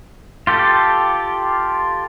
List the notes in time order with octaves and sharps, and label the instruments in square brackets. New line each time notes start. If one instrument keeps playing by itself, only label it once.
[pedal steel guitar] F4 G4 A4